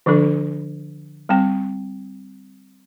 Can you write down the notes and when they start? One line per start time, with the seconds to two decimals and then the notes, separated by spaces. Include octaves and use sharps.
0.06 D3 F3 D4 A4
1.29 G3 C4 G5